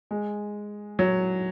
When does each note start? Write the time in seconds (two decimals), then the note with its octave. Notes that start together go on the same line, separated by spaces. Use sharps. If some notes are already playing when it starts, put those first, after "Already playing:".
0.11 G#3
0.99 F#3